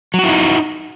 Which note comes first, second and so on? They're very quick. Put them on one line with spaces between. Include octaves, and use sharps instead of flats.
F#3 F#4 E4 D#4